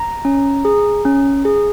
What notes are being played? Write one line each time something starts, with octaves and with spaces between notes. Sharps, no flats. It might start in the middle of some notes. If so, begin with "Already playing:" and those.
Already playing: A#5
C#4
G#4
C#4
G#4